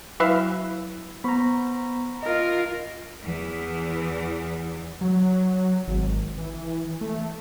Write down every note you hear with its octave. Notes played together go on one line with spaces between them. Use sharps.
F#3 E4 B4 E5 F5
B3 C5 A#5 B5 C#6
F4 A#4 D#5
E2 E3
F#3
G#1
E3
A3